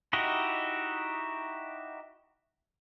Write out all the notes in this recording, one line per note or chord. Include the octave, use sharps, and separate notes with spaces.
D#4 E4 F#4 G4 D#5